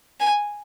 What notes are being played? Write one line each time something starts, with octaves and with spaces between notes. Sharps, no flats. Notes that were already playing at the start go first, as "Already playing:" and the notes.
G#5